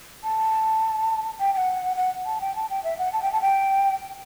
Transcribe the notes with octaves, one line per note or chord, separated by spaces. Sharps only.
A5
G5
G5
F#5
F#5
A5
G5
A5
G5
E5
F#5
A5
G5
A5
G5